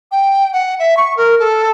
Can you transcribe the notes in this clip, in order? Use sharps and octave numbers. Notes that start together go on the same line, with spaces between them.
G5
F#5
E5
C#6
A#4
A4